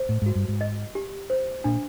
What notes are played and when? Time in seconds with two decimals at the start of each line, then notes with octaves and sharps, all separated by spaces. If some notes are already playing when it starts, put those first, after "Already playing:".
Already playing: C5
0.09 A2
0.22 G#2 F#4
0.35 G2
0.48 G#2
0.61 D#5
0.95 G4
1.30 C5
1.64 A#2 D4